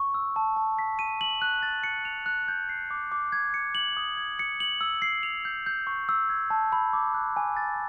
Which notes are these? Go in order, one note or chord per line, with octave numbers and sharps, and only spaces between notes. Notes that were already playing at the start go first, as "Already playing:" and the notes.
Already playing: C#6
E6
A5
A5
B6
D#7
F#7
F#6
A6
C#7
F7
F#6
G6
C7
D6
D6
G#6
C#7
F#7
D#6
G#6
C#7
F#7
E6
C7
F7
G6
G6
C#6
E6
G#6
A5
B5
D6
F#6
G#5
A6